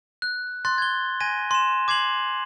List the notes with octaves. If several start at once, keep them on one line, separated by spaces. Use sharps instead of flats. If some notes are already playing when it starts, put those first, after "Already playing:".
F#6
C6 F#6 A6
G#6 G7
G#5 G#6 A#6 D#7
C6 E7
D6 G#6 C7 F7 F#7